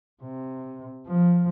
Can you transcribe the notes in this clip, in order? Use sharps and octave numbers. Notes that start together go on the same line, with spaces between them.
C3
F3